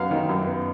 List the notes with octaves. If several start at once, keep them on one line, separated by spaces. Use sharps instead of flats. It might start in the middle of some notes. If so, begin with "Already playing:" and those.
Already playing: F#2 F#3 B3 F5 F#5
D#3
F#2
B3